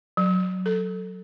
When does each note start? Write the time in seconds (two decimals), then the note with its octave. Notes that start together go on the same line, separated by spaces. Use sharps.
0.17 F#3
0.66 A4